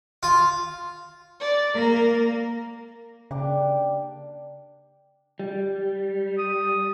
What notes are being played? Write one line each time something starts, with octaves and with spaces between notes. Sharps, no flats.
F4
D5
A#3 A#4
C#3 A#3 D4 G4
G3
D#6